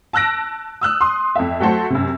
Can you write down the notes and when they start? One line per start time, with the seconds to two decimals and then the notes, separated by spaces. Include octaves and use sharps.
0.13 A5 E6 F#6 A#6 D7
0.81 D#6 E6 F#6
1.01 C6 D#6
1.36 F2 A4 E5
1.60 F#3 A3 F#4 A4 C5
1.90 F#2 C3